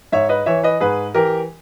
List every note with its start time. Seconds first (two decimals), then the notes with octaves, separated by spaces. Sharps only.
0.12 G#2 C#5 E5
0.29 B4 D#5
0.46 E3 C#5 E5
0.63 B4 D#5
0.80 G#2 G#4 B4
1.15 E3 G4 A#4